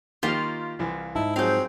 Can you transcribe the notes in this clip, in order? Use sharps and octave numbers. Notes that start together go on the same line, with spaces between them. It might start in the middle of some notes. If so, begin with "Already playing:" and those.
D#3 A#3 F4 G4
C2 E3
G#2 D#4 E4 A5
F3 F#3 C4 G#4 F5 G6